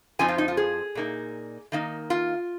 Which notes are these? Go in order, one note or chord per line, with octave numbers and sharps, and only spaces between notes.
F2 F3 C4 D#4 G#5
F4
D#4
F4
G#4
A#2 A#3 D#4
D#3 A#3 D#4
F4